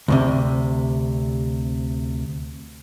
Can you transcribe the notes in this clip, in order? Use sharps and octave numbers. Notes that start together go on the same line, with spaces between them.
D2 A2 C3